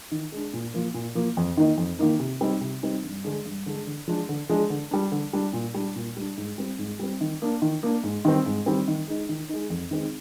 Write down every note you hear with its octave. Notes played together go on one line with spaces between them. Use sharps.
D#3
G#3 D4
A#2
F3 A#3
A#2
F3 A#3
F2
D#3 A#3 D#4
F2
D#3 A#3 D#4
C3
G3 C4 D#4
C3
G3 C4 D#4
G2
D3 G#3 D4
G2
D3 G#3 D4
D3
F3 G#3 D4
D3
F3 G#3 D4
D3
G3 D4
D3
G3 D4
A#2
G3 D4
A#2
G3 D4
G#2
G3 C4
G#2
G3 C4
D#3
A#3 D4
D#3
A#3 D4
G#2
D#3 G3 C4
G#2
D#3 G3 C4
D#3
G#3 D#4
D#3
G#3 D#4
F2
D#3 G#3 C4 D#4